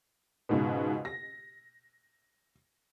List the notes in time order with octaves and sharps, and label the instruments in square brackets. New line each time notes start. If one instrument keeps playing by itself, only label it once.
[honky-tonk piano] C#2 G#2 B2
A#6